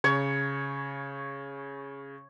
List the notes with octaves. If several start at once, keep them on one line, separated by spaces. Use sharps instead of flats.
C#3 C#5